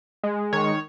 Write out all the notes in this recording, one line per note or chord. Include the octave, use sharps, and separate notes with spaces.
G#3
D#3 C#5